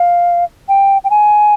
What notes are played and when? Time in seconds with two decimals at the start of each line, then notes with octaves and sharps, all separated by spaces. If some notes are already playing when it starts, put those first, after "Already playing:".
Already playing: F5
0.69 G5
1.04 G5
1.10 G#5